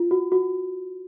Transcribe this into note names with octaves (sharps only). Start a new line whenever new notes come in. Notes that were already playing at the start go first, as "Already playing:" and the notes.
Already playing: F4
F#4
F#4